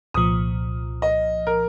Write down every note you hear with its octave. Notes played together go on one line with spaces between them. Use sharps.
C2 A#2 F3 D#6
D#5
A#4